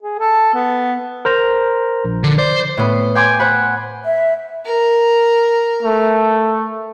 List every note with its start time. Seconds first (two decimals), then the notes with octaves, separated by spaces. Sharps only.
0.02 G#4
0.19 A4
0.54 B3
1.25 A#4 C5 A#5
2.05 A#1
2.24 D3
2.38 C5 D5
2.77 A2 B3
3.15 G5 G#5 C6 D6 G6 G#6
3.39 C5 F#5 B5
4.05 E5
4.66 A#4
5.82 A3